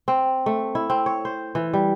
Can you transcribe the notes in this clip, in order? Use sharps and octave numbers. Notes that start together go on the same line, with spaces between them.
C4
A3
E4
C4
C#5
C5
E3
G3